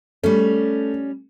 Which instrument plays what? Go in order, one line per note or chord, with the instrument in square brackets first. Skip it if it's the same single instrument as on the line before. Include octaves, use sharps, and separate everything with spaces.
[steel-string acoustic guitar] G3 C#4 [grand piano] A3